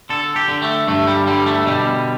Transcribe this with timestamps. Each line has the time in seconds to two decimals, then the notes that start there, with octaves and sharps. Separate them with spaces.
0.10 D3 A4
0.36 G4
0.48 D3
0.62 A3
0.87 G2 A3
1.07 G3
1.27 D3 G3
1.46 A3
1.66 B2 G3